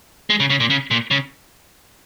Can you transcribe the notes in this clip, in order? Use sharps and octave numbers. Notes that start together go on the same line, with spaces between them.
G#3
C#3
C#3
A#2
C#3
A#2
C#3